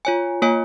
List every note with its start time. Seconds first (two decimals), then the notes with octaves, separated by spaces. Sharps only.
0.05 F4 C#5 G#5
0.42 A#3 F4 C#5 G#5